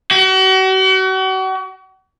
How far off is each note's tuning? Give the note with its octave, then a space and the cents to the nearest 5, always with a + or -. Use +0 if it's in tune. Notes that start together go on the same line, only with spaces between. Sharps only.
F#4 +40